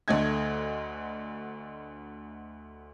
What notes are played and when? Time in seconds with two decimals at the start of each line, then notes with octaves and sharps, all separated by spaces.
0.08 D2 D3 A3 D#5 G#6